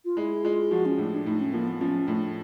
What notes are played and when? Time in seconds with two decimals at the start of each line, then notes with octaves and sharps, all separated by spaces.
0.05 F4
0.17 G#3 E4
0.44 G#3 F4
0.71 F3 F#4
0.86 C#4
0.98 A2 D4
1.12 D4
1.26 A2 D#4
1.40 C#4
1.53 F3 A#3
1.67 B3
1.81 F3 C#4
2.07 A2 D4